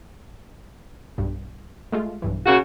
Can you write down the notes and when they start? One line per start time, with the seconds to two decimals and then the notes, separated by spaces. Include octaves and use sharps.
1.18 B1 G2
1.92 G#3 A3 F4
2.22 B1 G2 E3
2.46 C#3 A#3 F#4